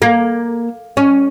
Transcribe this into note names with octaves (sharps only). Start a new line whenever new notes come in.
A#3
C#4